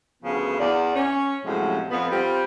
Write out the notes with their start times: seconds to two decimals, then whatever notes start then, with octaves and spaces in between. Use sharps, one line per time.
0.23 D2 C#3 F3 B3
0.60 E2 B3 D5
0.95 C#4
1.45 A2 C3 F3 F#3 G#3 C#4
1.91 F2 B3
2.11 G3 C4 F4